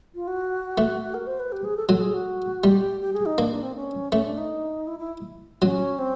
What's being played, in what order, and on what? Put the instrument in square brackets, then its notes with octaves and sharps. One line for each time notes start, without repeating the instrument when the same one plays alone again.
[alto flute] F4
F#4
[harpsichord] A3
[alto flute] A#4
C5
B4
G4
G#4
A4
[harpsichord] F#3 [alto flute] A4
[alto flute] G#4
F#4
[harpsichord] G3 [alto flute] G4
[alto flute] G4
G#4
D#4
[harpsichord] A#3 [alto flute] D4
[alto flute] D4
C4
C#4
[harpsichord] A3 [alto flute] C#4
[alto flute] D4
D#4
E4
E4
[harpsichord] F#3 [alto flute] C#4
[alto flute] C4